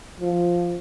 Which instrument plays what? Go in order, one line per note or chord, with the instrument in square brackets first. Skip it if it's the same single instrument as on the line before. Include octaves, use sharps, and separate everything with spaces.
[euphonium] F3